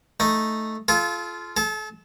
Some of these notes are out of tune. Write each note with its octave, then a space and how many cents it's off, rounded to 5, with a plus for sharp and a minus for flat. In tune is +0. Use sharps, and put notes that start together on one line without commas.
A3 +0 D#4 +0
F4 -10 A4 -40
A4 -40 A5 +0